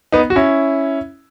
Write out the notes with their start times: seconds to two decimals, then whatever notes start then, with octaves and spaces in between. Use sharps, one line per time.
0.12 B3 D#4
0.30 F#4
0.36 C#4 E4